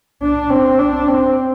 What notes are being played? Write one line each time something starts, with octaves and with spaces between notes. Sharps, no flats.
D4
C4
D4
C4